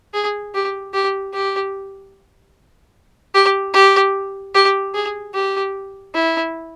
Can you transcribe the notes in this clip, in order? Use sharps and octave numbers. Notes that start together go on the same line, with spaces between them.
G#4
G4
G4
G4
G4
G4
G4
G#4
G4
E4